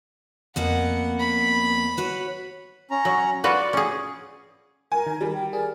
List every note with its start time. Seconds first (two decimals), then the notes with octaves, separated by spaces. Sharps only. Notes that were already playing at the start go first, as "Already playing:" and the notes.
0.56 F2 A#3 B3 F#5
1.20 B5
1.97 F#4 B4 C#5
2.91 C#4 A#5
3.05 F#3
3.44 F4 F#4 B4 D5
3.73 C#4 G#4
4.92 A#4 G#5
5.07 D#3
5.21 G3
5.34 G5
5.53 G#4 A#4 D5